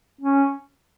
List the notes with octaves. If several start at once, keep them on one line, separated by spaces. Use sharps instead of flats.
C#4